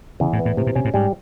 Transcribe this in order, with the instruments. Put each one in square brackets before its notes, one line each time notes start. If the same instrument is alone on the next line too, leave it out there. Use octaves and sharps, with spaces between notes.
[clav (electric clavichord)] E2 [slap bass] C#3
[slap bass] A2
[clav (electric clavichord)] E3
[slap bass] A2
[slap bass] A2 [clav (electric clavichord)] C3
[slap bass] A#2
[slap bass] B2 [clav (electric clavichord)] C#4
[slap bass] A2
[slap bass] G#2 [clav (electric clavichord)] G3